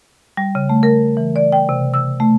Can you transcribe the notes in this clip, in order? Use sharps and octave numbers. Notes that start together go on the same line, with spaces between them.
G3
C#3
A3
A#4
E3
D5
G5
C3
E6
A3